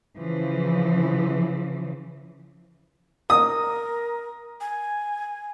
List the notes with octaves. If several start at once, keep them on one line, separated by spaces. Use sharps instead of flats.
C#3 E3 F3
A#4 D#6
G#5